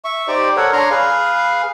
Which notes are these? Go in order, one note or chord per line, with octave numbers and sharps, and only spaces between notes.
E5 C#6
D#4 G4 C5 D5
A4 A#4 C#5 F#5
D4 C#5 A#5 C6
G#4 B4 F5